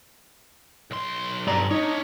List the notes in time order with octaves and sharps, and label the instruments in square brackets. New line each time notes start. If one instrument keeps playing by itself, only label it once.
[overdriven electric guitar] B1 C6
[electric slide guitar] G2 D5 A#5
[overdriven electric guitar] D4 C#5 [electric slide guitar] D#4